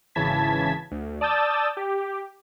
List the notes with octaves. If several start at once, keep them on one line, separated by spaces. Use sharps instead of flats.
G#1 C#3 E3 A5 G#6 B6
D2
D5 A5 D#6 E6 G6 A6
G4